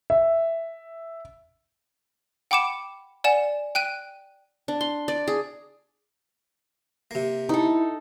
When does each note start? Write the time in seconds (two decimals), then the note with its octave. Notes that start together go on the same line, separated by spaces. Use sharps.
0.10 E5
2.51 F#5 G5 B5 D6 C#7 E7
3.24 D5 F#5 G#5 E7
3.75 G5 F#6 D#7
4.68 D4
4.81 C6
5.08 D5
5.27 G#4
7.11 C3 A#3
7.49 D#4 E4 A4